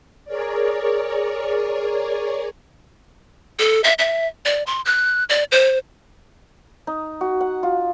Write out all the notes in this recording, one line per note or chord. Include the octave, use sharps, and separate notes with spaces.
G#4 A#4 C#5 D5
A4
E5
E5
D5
C6
F#6
D5
C5
D#4
F#4
F#5
F4